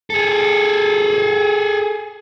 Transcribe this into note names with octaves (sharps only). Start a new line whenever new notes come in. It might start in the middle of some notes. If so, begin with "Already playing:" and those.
G#4 A4